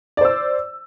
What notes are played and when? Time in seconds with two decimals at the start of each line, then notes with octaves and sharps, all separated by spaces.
0.17 D5
0.21 C5
0.25 E6